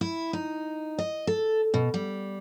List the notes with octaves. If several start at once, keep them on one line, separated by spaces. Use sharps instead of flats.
E4
D#4
D#5
A4
B2
G3